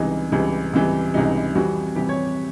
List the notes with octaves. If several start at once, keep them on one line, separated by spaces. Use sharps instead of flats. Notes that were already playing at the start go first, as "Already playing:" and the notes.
Already playing: C#2 C3 E3 G3 D#4
C#2 C3 E3 G3
C#2 C3 E3 G3
C#2 C3 E3 G3 D#4
F2 C3 E3 G3 F#4
F2 C3 E3 G3 G4
C#5